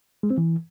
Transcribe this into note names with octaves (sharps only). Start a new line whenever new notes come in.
G#3
C4
E3